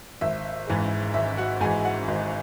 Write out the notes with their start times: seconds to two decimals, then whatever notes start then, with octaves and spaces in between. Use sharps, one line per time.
0.21 G#1 E5
0.67 G#2 E3 G#3
1.14 G#1 E5
1.37 F#4 F#5
1.61 G#2 E3 G#3 G#4 G#5
1.85 F#4 F#5
2.08 G#1 D#5